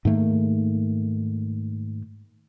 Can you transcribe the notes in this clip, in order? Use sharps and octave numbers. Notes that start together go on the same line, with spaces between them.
G#2 D#3 A3 A#3